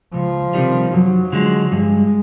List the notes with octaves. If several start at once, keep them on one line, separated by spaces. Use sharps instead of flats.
C#2 F3
C3 D#3 G3
F#2 F#3
D3 F3 G#3
G2 G#3